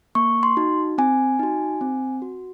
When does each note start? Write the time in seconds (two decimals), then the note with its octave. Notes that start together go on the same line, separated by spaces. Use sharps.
0.15 A#3 C#6
0.43 C6
0.57 D#4 F#4
0.98 C4 G#5
1.39 D#4 F#4
1.81 C4
2.22 F#4